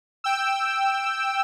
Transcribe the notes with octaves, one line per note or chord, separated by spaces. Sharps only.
G5 E6